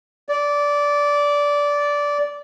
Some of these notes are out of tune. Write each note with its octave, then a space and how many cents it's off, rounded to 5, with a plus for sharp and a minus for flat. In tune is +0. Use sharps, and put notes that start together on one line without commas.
D5 -15